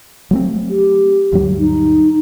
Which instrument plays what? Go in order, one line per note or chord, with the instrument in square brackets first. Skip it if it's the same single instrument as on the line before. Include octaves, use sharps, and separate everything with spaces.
[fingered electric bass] F#3 A3 C4
[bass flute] G4
[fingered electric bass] D2 G2 F#3
[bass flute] D#4